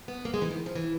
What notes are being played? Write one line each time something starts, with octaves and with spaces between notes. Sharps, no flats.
B3
A#3
G#3
E3
D#3
F3
E3